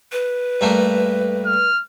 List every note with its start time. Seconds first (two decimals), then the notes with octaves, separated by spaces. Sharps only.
0.12 B4
0.61 G2 A3 A#3
1.46 F6